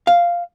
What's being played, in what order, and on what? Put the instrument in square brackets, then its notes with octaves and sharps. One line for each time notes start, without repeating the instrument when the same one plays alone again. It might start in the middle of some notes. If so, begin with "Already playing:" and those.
[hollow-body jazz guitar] F5